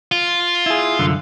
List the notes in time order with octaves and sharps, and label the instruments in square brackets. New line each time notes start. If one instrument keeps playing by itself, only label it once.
[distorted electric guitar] F4
[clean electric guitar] E4 G#4
C2 F#2 D3